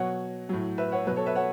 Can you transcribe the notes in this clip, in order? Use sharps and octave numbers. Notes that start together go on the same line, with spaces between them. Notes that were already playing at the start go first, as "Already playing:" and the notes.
Already playing: B2 F#3 C#5 F#5
A2 F#3
B4 E5
C#5 F#5
B2 F#3 B4
A4 C#5
B4 E5
C#5 F#5